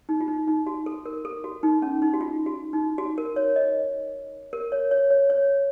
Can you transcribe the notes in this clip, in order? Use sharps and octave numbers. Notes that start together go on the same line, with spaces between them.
D#4
F4
D#4
D#4
F#4
A4
A#4
A4
F#4
D#4
C#4
D#4
F#4
F4
F#4
D#4
F#4
A#4
C#5
D#5
A#4
C#5
C#5
C#5
C#5